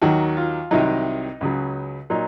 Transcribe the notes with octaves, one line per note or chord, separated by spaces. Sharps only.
D#2 D#3 F#3 F#4
F4
C2 C3 D#3 F#3 D#4
C#2 C#3 F#3
A#2 F#3 D#4